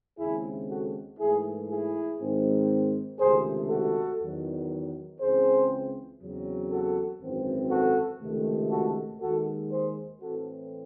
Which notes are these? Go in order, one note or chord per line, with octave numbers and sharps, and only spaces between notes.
D#2 C#3 G#3 C4 E4 G#4
F#4 A4
G#2 E3 A3 E4 G#4
E4 G#4
G#2 D#3 G#3 C4
C#2 C3 D#3 A3 G#4 C5
F#4 A4
E2 D#3 F#3
C#2 C#3 E3 C4 G#4 C5
E2 C#3 F#3 C4
F#4 A4
G#1 F#2 E3 C4
F#4 A4
C#2 C3 D#3 A3
F#4 A4
D#2 D#3 G#3 F#4 A4
G#4 C5
A2 E3 C4 F#4 A4